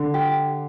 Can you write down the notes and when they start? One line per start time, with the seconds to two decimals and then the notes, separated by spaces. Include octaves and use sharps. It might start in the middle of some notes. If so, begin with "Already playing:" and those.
Already playing: D3
0.14 G4